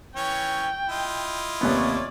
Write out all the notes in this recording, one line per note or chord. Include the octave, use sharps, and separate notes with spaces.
E3 C#4 C#5 G5
E4 F4 D#5
D#2 C3 B3 C#5 D5